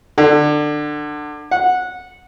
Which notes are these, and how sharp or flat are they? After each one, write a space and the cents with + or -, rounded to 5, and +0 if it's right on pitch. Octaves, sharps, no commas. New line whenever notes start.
D3 +25
F#5 -15